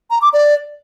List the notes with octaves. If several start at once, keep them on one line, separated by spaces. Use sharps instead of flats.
A#5
D6
D5